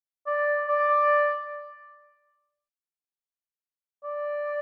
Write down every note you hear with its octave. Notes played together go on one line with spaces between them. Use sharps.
D5
D5
D5